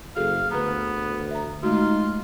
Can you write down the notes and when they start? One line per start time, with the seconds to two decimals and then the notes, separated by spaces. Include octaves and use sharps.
0.16 F#1 F#4 G#4 A4 F5
0.51 D2 B3 B4 A#5
1.31 E5 A#5
1.63 G#3 A3 D#4 F4 F#4